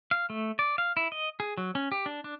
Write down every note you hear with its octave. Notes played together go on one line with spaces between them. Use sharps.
F5
A3
D5
F5
E4
D#5
G#4
F#3
C#4
G4
D4
D4